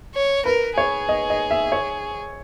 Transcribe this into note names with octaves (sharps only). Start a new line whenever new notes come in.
C#5
A#4 B4
G#4 C#5
D#5
D#5
E5
C#5